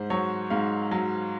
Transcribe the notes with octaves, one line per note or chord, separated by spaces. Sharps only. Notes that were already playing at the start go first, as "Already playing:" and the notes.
Already playing: G#2 C5
F#3 C#5
G#2 F5
F#3